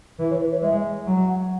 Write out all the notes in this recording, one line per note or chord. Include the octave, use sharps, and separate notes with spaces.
E3 B4
C#5
B4
C#5
G#3 E5
F#3
F#5